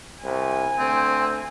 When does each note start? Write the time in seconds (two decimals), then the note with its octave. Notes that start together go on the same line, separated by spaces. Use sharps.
0.24 C2 G#5
0.79 D2 C4